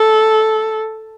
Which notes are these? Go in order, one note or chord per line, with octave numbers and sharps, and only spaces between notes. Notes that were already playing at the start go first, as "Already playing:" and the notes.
Already playing: A4